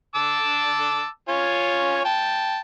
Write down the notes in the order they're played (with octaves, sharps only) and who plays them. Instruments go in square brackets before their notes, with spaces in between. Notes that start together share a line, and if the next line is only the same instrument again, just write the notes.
[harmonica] A5 D6 E6
F4 C#5 G#5
G5 A5